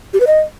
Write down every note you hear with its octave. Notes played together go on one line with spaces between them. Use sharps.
G4
B4
D#5